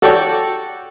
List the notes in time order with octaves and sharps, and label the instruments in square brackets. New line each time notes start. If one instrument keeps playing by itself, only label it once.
[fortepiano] F#4 A4 C#5 D5 G5